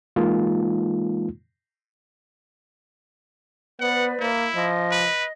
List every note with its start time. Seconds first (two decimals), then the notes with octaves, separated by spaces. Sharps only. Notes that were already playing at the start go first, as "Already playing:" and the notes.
0.16 E3 G#3 A#3 D#4 F4
3.80 B3 B4 C5 D5 F#5
4.20 A#3 E4
4.55 F3 D#5
4.92 B4